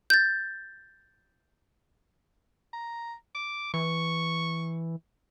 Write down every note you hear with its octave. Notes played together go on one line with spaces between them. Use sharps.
G6 A6
A#5
D6
E3 C#6